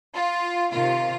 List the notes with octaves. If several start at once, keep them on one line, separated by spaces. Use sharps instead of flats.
F4
C3 D#3 F4